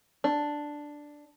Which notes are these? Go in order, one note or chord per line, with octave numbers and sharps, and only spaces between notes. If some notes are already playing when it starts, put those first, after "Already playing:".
D4